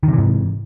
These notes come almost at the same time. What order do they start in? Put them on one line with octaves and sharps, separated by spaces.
D#3 C3 E3 G#2